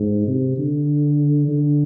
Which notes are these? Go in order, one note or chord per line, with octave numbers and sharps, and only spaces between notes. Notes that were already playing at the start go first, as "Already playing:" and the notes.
Already playing: G#2
C3
D3
D3